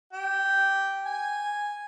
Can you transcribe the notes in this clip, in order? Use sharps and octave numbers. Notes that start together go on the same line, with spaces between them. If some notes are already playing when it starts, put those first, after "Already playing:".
G4
G#5